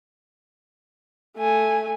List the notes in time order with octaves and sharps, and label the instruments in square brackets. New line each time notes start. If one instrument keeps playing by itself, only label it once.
[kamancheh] A3 G#5